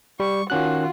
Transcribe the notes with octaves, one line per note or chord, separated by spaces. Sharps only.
G3 C#6
D#3 C#4 F4 F#4 F#6